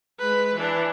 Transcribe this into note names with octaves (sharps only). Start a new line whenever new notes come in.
G#3 B4
E3 D4